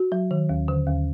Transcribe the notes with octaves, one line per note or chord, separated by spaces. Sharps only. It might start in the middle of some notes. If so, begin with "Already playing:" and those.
Already playing: F#4
F#3
D#3
D#2
D3
D#2